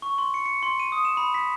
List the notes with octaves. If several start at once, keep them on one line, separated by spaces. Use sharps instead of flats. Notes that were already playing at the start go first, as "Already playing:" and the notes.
C#6
C6
C#7
C#7
C6
D#7
D#6
E7
B5
B6